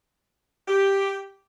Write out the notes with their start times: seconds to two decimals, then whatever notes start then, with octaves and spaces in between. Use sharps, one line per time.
0.68 G4